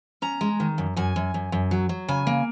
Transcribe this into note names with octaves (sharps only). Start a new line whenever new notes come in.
C#4 A#5
G#3
D#3
F#2
F#2 G#5
F#2
F#2
F#2
F#3
F#3
C#3 G#5
A#3